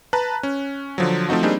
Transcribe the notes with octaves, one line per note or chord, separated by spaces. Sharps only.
B4 A5 A#5 F#6
C#4
D3 F3 F#3
F3 A3 C4 D#4 F#4
G3 A#3 C4 D4 D#4 G#4